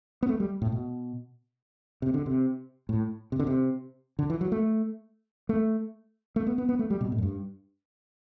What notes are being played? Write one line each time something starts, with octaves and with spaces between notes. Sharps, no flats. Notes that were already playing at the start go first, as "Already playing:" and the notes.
B3
A3
G3
A2
B2
C3
D3
C3
A2
C3
D3
C3
D3
E3
F#3
A3
A3
A3
B3
B3
B3
A3
G3
B2
A2
F#2
G2